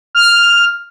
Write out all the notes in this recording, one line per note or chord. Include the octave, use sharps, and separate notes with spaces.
F6